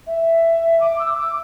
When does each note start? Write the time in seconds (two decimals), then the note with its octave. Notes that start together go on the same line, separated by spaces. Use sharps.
0.07 E5
0.81 D6
1.00 E6
1.18 D6